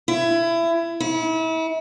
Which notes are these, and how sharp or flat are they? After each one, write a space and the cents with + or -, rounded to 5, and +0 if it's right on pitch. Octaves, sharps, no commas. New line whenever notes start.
E4 +25
E4 -35